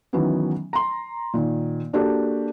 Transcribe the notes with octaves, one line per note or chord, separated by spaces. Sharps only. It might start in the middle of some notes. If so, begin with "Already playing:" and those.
D#3 E3 F#3 B3 C#4
A#5 C6
A#2 D#3
A#3 D4 F#4 G4 A4